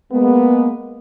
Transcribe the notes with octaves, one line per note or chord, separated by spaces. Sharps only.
G#3 A#3 B3